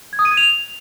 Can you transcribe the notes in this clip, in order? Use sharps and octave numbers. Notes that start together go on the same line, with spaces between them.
G#6
D#6
D#7
G#6
F7